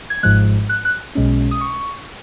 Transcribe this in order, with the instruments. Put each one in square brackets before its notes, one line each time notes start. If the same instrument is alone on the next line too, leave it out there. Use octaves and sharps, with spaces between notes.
[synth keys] G#6
G#1 G#2 F3 G#3 F#6
F#6
F#6
B1 B2 G#3 C#4
D#6
C#6